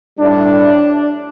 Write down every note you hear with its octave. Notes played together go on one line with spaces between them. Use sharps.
A2 G3 D4